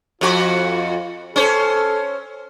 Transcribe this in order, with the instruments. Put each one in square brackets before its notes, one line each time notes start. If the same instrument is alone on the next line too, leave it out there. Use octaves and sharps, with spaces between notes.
[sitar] F2 F#4 [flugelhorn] F4
[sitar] C#4 C5 [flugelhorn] A4